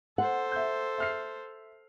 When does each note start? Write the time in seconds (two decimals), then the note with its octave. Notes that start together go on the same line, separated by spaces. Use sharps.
0.18 A4 C5 F#5
0.52 E5 G6
0.98 E5 F6 C7